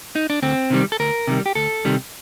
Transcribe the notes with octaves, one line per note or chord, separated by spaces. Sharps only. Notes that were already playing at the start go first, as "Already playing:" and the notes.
D#4
D4
D2 C4
C3 D#3 G3
A4
D2 A#4
C3 D#3 G3
G4
D2 A4
C3 D#3 G3